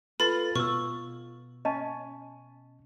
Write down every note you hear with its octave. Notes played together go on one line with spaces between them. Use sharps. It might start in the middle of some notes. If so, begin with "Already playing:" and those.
F4 A4 B4 B5 A6
B2 B4 C#6 E6
C#4 D#5 A5